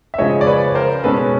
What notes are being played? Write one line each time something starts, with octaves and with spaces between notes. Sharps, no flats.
E5
C#3 F3 G#3 C#5 D#5
D5
B4 C#5
A#4 C5
B2 G#3 C#4 A4 B4